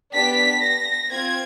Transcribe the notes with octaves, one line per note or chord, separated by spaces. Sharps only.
B3 D4 G4 B6
A#6
C4 F4 G#6